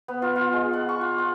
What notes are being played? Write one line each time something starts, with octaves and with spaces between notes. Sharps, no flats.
B3
F4
F4
G#3
F#5
C#6
F4
F#5